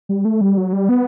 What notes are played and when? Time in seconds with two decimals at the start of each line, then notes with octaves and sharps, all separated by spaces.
0.09 G3
0.25 A3
0.41 G3
0.57 F#3
0.73 G3
0.89 B3